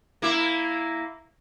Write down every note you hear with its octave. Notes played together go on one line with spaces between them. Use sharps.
A#3 E4